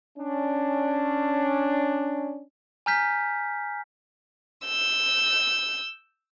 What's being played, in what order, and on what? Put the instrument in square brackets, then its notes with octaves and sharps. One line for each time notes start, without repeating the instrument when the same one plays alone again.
[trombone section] C#4 D4
[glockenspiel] G#5 A#5 F6 G6 B6
[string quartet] E6 G6